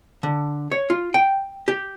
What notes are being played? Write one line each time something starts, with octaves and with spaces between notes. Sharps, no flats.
D3
C#5
F4
G5
G4